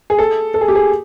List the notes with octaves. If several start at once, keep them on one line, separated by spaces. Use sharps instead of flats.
G#4
A4
A4
G#4
G4
G#4